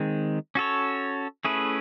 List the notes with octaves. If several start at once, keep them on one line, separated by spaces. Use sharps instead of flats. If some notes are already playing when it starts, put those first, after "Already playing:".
Already playing: D#3 G#3 C4
C#4 F#4 A4 C#5
A3 C#4 E4 G#4 B4